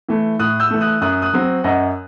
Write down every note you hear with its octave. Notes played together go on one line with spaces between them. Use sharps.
E3 A3
A2 D#6 F#6
E6 G6
E3 A3
D#6 F#6
F#2 D#6 F#6
D#6 F#6
F#3 C4
F#2 D#5 F#5